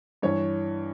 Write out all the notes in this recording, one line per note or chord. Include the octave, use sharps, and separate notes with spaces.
G2 E3 C#5